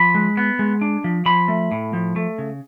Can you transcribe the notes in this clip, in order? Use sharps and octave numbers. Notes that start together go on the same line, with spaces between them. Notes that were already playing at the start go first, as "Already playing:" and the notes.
Already playing: F3 B5
G#3
B3
G#3
D4
F3
F3 B5
A3
A2
F3
A3
C#3